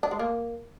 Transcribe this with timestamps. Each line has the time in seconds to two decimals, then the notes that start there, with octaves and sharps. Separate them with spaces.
0.03 D4
0.11 G#3
0.19 A#3